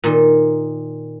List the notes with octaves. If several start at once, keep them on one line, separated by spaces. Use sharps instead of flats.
A#2 D#3